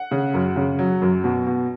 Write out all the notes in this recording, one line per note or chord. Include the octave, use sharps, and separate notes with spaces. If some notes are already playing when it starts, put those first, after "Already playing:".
Already playing: F#5
C#3
F#2
C#3
F#3
F#2
B2
B2